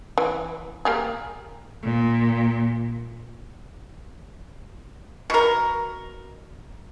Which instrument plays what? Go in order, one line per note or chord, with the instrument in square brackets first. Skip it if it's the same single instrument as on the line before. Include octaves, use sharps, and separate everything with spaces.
[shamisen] E3
A#3 G4 G#4
[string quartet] A#2
[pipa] B2 A#4